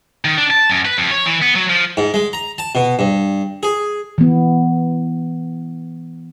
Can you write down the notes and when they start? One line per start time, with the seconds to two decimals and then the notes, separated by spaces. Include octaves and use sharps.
0.25 D#3
0.37 D4
0.50 A5
0.70 F#2
0.86 B4
0.98 F2
1.11 C#5
1.26 E3
1.42 B3
1.55 F#3
1.69 F3
1.97 G#2
2.14 G#3
2.33 A#5
2.58 A5
2.75 B2
2.99 G2
3.63 G#4
4.18 E3 B3